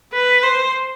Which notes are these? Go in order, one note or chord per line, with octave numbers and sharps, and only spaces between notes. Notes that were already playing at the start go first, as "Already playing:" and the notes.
B4
C5